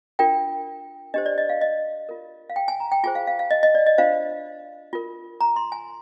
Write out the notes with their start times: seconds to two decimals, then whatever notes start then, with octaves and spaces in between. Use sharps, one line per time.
0.19 D4 F4 A#4 G5
1.14 D4 G4 C5 D#5
1.26 D5
1.38 D#5
1.49 F5
1.61 D#5
2.09 F4 A#4
2.50 F5
2.56 G5
2.68 G#5
2.80 A#5
2.92 G5
3.04 F4 G#4 C5 G#5
3.15 F5
3.27 F5
3.39 F5
3.51 D#5
3.63 D#5
3.75 D5
3.86 D#5
3.98 D4 F4 C5 F5
4.93 F4 A#4
5.41 A#5
5.56 C6
5.72 G#5